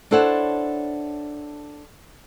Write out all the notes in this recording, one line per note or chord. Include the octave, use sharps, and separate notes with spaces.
D4 E4 A4 C5 C#5 F#5